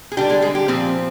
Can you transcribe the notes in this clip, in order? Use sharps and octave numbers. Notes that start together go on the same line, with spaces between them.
G#4
D3 G3 D4 G4
G#3 G#4
G#3 G#4
G4
A#2 F3 C4